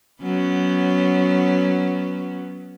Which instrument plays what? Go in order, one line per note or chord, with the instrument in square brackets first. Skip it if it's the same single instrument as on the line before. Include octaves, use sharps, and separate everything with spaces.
[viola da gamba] F#3 B3 C#4